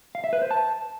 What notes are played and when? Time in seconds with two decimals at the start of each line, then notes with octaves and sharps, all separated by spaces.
0.15 F5
0.24 E5
0.33 B4
0.42 C5
0.51 A5